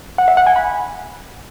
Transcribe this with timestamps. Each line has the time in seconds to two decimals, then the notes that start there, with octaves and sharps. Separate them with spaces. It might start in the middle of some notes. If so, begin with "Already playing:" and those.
0.18 F#5
0.28 E5
0.37 F#5
0.47 G#5
0.56 B5